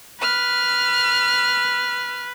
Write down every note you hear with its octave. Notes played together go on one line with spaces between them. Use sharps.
B4 F6